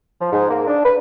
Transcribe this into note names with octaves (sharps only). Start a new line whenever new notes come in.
F3
G#2
A#3
D4
B4